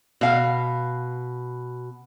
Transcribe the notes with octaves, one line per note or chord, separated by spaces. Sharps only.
B2 F5